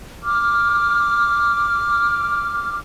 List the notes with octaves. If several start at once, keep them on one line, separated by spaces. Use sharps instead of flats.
D6 F6